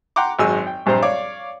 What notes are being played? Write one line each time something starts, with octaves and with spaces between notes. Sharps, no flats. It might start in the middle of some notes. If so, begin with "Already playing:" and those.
F#5 G5 A#5 C6 D6
G#1 F#2 G#3 G#5 E6
G5
A#1 G2 C4 C5 A#5
C#5 D5 F5 D6